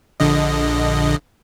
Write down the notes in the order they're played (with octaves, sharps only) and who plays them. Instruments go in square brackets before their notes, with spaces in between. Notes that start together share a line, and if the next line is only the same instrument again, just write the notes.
[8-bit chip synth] A#1 D3 D#5